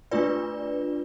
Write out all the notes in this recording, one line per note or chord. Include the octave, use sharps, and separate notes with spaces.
A3 D4 F4 B4 D5